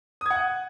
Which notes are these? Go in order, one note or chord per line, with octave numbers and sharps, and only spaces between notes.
F#5 D#6 G#6